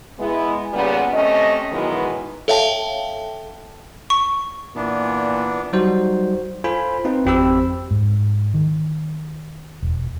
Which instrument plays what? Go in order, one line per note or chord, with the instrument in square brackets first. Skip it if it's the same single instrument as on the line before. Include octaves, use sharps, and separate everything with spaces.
[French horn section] G#3 B3 E4
A#2 C#3 G3 B3
C3 A3 C#4 D#5
B2 D#3 E3 F#3 G#3 B3
[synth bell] A4 C#5 E5 F5 G5 A5
[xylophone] C#6
[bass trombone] A#2 [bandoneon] E3 B3 D4
[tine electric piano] F#3 G3 D#4 F#4 C5
F4 A4 C5 G#5 B5
C4 D#4 F4 B4
G#1 F2 C4 G4 B5 E6
[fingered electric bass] G#2
D#3
E1